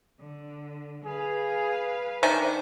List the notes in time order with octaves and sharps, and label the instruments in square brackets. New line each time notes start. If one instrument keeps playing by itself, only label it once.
[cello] D3
[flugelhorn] G#4 [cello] B4 F5
[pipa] D#3 [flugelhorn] D4 [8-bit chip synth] C5 E5 G#5